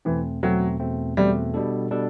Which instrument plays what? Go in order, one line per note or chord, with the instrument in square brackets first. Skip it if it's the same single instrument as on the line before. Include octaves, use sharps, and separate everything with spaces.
[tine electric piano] E2 B2 A3 C4 [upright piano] E3
[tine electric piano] E2 B2 A3 C4 [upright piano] F#3
[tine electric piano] E2 B2 A3 C4
[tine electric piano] E2 B2 A3 C4 [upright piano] G3
[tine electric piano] B2 G3 D4 A4
B2 G3 D4 A4